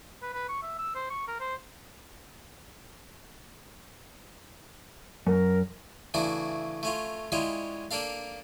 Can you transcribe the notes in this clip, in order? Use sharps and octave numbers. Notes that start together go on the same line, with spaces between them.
B4
B4
C#6
E5
E6
C5
C#6
A#4
C5
F#2 A#4
C#3 E3 A3 D4 F#4
A3 C#4 F4
G3 G#3 C#4 E4 F4 C#5
A#3 D4 A4 F5